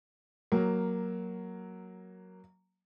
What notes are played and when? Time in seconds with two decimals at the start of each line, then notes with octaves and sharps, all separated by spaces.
0.52 F#3 A#3